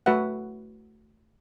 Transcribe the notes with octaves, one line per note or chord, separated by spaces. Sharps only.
A3 F#4 B4 E5 F#5